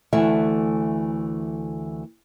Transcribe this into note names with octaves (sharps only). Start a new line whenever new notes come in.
D2 E3 A3 E5